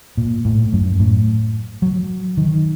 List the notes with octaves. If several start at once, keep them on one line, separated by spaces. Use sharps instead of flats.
A#2
A2
F#2
A2
F#3
D#3